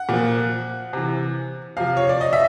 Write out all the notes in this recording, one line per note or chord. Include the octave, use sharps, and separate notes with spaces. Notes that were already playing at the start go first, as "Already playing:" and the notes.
Already playing: F#5
A#2 F3
C3 E3
C3 F3 F5
C#5
D5
D#5
E5